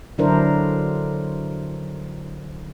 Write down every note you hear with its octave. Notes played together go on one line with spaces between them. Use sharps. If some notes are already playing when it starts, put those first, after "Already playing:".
D3 F#3 D4 E4 A#4 C5